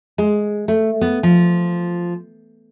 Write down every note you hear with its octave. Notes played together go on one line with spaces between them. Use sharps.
G#3
A3
B3
F3